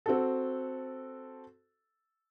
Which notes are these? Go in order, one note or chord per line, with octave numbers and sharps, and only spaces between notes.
C4 F#4 A4